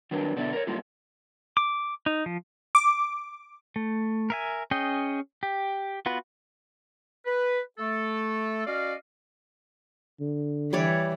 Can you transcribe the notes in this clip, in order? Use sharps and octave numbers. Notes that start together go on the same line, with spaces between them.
D#3 F#3 G3 D4 A#4 B4
B2 D3 B3 D5 E5
A#4 C#5
F#3 G3 A3 A#3 D#4 F4
D6
D#4
F3
D6
A3
A#4 E5 G#5
C#4 G#4 D#5 G5
G4
B3 F4 F#4 B4
B4
A3 A4
C#4 F#4 D5 D#5 F5
D3
E3 G3 C#5 D5